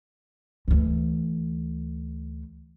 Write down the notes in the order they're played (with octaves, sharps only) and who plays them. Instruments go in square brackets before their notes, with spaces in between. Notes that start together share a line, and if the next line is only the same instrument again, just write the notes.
[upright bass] D2 E3